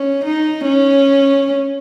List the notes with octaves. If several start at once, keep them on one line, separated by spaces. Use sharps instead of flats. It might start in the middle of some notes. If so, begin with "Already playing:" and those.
Already playing: C#4
D#4
C#4